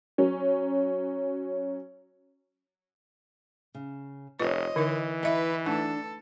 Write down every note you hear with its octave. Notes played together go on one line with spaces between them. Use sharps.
F#3 C#4
C#3
F1 C4 F4 B4 C#5 D#5
D3 E3 D#4 A#4
E4 B4 D#5 E5 F#5
A3 D4 D#4 A4